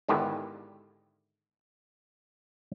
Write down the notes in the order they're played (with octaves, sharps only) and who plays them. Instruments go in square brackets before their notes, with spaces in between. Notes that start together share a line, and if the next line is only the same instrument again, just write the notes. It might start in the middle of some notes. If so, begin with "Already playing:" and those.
[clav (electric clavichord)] G#2 D3 D#3 B3 E4 G4